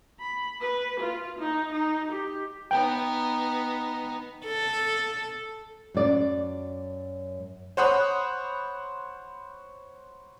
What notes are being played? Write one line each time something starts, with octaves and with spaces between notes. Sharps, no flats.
B5
B4
F4
D#4
D#4
G4
B3 D#4 G5
A4
F#2 D5
C5 C#5 F#5 B5 D#6 F#6